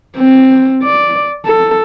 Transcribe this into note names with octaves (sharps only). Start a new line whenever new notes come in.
C4
D5
A4